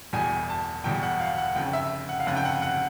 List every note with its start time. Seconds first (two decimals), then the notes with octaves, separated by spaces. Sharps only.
0.13 E1 E2 B2 G3 G#5
0.49 A5
0.84 E1 E2 B2 G3 G5
1.03 F#5
1.20 F5
1.38 F#5
1.55 F1 F2 C#3 G5
1.73 E5
2.09 F#5
2.20 F5
2.26 F1 F2 C#3 F#5
2.36 G5
2.45 F#5
2.62 F#5